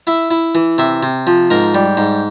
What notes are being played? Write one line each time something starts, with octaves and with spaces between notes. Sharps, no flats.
E4 E5
E4
E3
C3 E5
C3
F3
G#2 A#4
G3
G#2